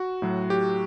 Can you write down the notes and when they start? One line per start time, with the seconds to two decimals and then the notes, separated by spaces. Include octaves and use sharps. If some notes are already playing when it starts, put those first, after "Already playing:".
Already playing: F#4
0.22 A2 F#3
0.50 G4